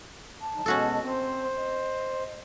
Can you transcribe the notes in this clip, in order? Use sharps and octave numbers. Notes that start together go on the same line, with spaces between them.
A5
D#3 F#3 D#4
B2 G#3 C#4 F#4 A4
C4 C5
D#5